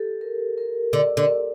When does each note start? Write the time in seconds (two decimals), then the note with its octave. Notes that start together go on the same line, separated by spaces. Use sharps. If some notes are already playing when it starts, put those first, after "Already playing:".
Already playing: G4 A4
0.21 A#4
0.58 A#4
0.93 D3
1.17 D3